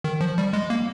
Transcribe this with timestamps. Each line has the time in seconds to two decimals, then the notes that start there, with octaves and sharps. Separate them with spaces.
0.04 D#3
0.21 F3
0.38 G3
0.53 G#3
0.70 A#3